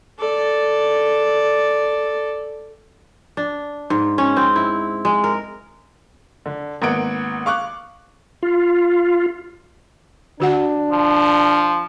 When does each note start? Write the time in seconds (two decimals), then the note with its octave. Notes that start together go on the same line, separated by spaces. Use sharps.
0.20 A4 D5
3.37 D4
3.90 G#2
4.18 C#4
4.37 C4
4.56 E4
5.05 G#3
5.24 A#4
6.46 D3
6.82 G#1 A#3 B3 F#5 D7
7.46 F5 C#6 D6 F#6
8.43 F4
10.40 D3 D4 F#4 F#5
10.91 F3